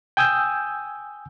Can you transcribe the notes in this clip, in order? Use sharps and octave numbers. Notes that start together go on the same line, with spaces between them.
G5 G#5 D#6 E6 G6